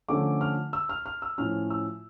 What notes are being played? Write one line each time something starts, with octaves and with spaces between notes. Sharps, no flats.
D3 F3 A3 C#4 D6
F6
E6
F6
F6
E6
A2 F3 C#4 F6
E6